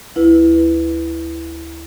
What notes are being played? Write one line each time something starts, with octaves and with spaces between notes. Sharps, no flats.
D2 E4 B4